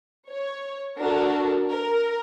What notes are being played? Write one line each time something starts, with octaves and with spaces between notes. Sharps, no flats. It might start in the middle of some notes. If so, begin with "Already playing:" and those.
C#5
D4 F#4 A4 A#4
A#4